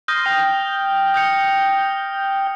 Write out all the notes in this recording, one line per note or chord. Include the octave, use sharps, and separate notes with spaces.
C6 D#6 F6 G6 A#6
G5 D#6
D#6 G6 C#7